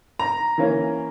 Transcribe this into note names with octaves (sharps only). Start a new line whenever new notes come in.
A#5
E3 A#3 C#4